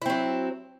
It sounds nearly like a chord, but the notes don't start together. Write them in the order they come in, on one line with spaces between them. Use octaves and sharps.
E4 C4 F#3